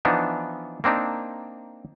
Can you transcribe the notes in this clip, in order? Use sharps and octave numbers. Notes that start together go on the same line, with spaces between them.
E3 F3 B3 D4 D#4
A#3 C4 D4 D#4